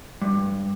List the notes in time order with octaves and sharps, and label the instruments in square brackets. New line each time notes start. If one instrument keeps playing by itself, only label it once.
[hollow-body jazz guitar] G2